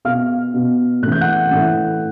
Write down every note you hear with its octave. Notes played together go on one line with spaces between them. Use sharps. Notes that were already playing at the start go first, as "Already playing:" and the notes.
B2 F5 F6
B2
A2 E3 F#6
G6
F#5 F#6
A2 E3